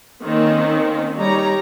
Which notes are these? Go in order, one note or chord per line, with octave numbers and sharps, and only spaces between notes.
D#3 A#3 C4 C#4
G3 D#4 C#5 A#5